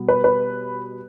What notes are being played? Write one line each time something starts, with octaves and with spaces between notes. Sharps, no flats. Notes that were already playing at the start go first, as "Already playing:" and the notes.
Already playing: B2 G3 B3
B4
B4